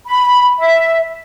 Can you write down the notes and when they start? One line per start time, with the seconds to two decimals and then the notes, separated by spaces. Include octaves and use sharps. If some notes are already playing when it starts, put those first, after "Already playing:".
0.06 B5
0.58 E5